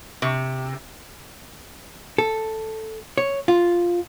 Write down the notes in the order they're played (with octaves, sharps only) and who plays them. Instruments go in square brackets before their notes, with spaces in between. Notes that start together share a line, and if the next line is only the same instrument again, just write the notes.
[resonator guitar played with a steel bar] C3
[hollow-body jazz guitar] A4
C#5
F4